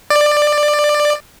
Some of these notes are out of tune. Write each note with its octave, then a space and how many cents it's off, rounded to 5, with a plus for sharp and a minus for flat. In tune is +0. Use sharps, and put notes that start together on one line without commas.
D5 +15